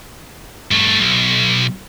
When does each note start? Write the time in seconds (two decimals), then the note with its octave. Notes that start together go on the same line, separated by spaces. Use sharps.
0.71 G2 A3
1.00 B1